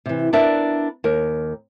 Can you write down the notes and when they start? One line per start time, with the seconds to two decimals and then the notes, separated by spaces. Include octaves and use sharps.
0.06 C3 E3
0.33 B3 D4 E4 A#4 D5 E5
1.04 D#2 A#4